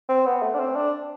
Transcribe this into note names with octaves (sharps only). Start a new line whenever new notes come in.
C4
B3
A3
D4
C4
D4